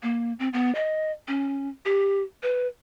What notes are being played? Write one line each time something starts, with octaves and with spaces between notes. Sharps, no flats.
A#3
C4
B3
D#5
C#4
G4
B4